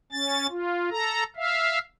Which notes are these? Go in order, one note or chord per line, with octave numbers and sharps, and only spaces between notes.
C#4 A6
F4
A4 A#5
E5 F5